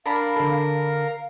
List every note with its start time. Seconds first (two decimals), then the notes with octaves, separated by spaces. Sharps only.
0.06 D4 A#4 F5 B5
0.36 D3 A4
0.74 F5